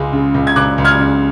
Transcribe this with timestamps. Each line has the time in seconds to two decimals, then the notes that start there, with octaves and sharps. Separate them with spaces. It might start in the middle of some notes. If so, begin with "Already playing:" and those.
Already playing: C#2 G#3
0.13 C#3
0.34 C#2
0.47 G#6
0.56 C#2 D6 F#6
0.78 C#2
0.85 F6 G#6
0.99 C#3